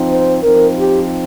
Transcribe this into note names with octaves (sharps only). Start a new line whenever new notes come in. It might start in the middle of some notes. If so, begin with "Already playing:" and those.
Already playing: F3 C4 D#4
C5
F3 C4 D#4 A#4
G4